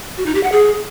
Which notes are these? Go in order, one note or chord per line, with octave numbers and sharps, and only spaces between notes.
F#4
D#4
G4
F#5
G#4